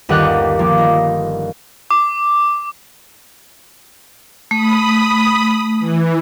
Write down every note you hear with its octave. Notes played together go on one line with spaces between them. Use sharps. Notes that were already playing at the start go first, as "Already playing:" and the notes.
G1 D#2 G4 D#5 F#5 F#6
F3 A#3 D5
D#4
D6
A3 B5 D#6
E3